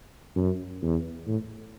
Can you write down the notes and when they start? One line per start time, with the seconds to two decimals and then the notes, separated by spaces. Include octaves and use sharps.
0.36 F#2
0.82 E2
1.27 A2